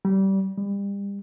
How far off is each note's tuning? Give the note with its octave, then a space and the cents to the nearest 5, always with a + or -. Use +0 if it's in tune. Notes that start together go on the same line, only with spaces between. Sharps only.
G3 -20
G3 +35